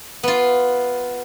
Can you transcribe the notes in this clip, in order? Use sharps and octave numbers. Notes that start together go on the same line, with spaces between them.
B3 F4